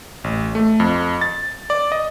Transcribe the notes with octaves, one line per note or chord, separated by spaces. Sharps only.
A1
A3
F2
A6
D5
D#5